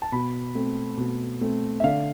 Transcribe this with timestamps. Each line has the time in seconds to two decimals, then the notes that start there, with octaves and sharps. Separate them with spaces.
0.02 A5
0.12 B2 B5
0.55 A3 C4
0.97 B2
1.41 A3 C4
1.80 E5
1.84 D3 F5